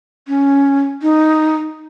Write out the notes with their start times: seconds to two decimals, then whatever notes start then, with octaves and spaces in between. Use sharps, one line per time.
0.28 C#4
1.02 D#4